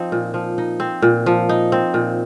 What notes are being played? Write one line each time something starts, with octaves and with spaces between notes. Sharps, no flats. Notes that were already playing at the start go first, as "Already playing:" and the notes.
Already playing: F3 C4 D#4
A#2
F3
D#4
C4
A#2
F3
D#4
C4
A#2